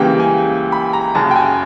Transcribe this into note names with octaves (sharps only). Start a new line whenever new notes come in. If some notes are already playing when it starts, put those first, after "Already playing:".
Already playing: C#2 C#3 E3 G3 A#3 G5
G#5
B5
A#5
F#1 F#2 C#3 A5
G5
G#5